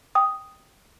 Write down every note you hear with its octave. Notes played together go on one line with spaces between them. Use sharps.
G5 D#6